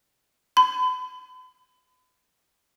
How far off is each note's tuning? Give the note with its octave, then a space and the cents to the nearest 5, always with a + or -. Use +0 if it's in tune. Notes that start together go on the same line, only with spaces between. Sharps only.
B5 +40